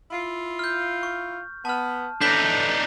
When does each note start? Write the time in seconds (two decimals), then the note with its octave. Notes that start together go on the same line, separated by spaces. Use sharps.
0.11 E4 F4
0.59 F6 G6
1.03 C#6
1.65 B3 A5 F6
2.21 A2 E3 D4 D#4 G6 B6